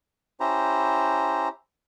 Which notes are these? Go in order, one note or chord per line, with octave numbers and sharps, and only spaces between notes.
C#4 E4 G4 C5 A#5